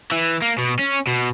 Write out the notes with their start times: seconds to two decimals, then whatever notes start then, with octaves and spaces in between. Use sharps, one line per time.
0.12 E3
0.42 A#3
0.58 B2
0.79 C#4
1.07 B2